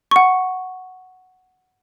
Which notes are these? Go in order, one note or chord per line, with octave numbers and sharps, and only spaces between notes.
F#5 C#6